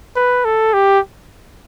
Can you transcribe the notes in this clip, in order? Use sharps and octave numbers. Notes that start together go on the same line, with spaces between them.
B4
A4
G4